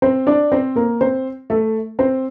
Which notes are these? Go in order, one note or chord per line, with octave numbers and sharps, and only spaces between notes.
C4 C5
D4 D5
C4 C5
A#3 A#4
C4 C5
A3 A4
C4 C5